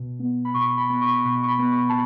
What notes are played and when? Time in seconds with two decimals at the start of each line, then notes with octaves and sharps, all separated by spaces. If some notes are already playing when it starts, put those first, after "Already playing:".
Already playing: B2
0.19 B3
0.45 B5
0.54 B2 C#6
0.77 B5
0.90 B3
1.01 C#6
1.25 B2 C#6
1.43 C#6
1.48 B5
1.59 B3
1.71 C#6
1.89 A5